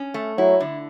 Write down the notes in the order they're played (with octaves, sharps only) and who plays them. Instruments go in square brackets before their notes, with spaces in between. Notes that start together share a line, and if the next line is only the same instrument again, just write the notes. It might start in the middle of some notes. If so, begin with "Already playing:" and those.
Already playing: [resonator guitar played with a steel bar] C#4
A3
[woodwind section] F#3 [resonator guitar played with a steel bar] E4
[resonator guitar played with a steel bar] D3